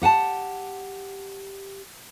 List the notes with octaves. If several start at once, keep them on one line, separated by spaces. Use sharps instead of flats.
G4 F#5 G#5 A5